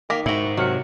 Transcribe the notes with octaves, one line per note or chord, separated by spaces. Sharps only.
D#3 A#3 A#4 D6 B6
G#2 E4 F#4
C3 D#3 F#3 F6 C#7